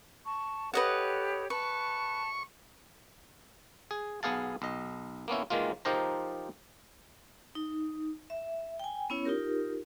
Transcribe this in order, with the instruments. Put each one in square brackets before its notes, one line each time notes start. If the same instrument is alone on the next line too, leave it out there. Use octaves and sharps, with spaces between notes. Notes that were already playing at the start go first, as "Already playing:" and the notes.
[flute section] A5 C#6
[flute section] G4 A4 C#5 [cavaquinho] B4 D#5 F#5
[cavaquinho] B4 [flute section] A5 [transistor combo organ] C#6
[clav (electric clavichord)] G#4
B1 B3 G#4 F5 A5
B1 D#5
A#3 B3 C#4 E4
D#3 E3 G#3 A#3 F4
F3 D#4 G4 A#4 C5 A#5
[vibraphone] D#4
E5
G5 G#5
B3 C#4 E4 C#5
D#4 F4 G4 A#4